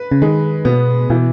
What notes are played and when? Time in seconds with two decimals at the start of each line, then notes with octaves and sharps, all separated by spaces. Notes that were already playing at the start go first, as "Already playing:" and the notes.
Already playing: B4
0.12 C#3
0.22 D#3 G#3
0.65 B2 B3
1.10 B2 E3